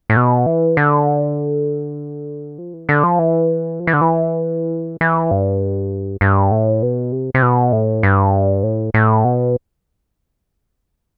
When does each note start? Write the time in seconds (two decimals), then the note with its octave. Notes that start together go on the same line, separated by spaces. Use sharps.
0.10 A2
0.17 B2
0.46 E3
0.77 D3
2.58 F3
2.73 E3
2.89 D3
3.03 F3
3.19 E3
3.80 F3
3.87 E3
3.93 D3
4.01 E3
5.01 E3
5.31 G2
6.21 G2
6.51 A2
6.82 B2
7.12 C3
7.34 C3
7.42 B2
7.72 A2
8.03 G2
8.63 A2
8.94 A2
9.24 B2